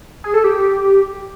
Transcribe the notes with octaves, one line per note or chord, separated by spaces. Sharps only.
G#4
A4
G4